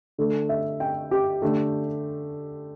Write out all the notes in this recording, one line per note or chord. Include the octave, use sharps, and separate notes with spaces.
D3 A3
E5
G5
G4
D3 A3 G4